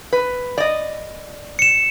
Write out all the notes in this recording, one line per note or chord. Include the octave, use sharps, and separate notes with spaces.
B4
D5 D#5
C#7 E7